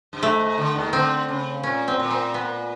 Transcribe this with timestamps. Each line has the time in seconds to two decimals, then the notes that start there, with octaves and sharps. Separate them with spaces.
0.13 G2
0.22 G#2 A3
0.41 G#2
0.58 D3
0.75 D#2 D#3
0.93 D3 C4
1.28 C#3
1.63 A#2 C#4
1.88 C4
1.99 A#2
2.10 C4
2.34 B3